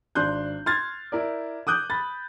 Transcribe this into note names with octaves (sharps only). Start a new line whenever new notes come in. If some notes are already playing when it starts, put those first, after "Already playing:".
G#1 D4 C6 F#6 G6
C6 F6 G#6 A6
E4 A#4 D5
D6 D#6 F#6 G6
B5 A6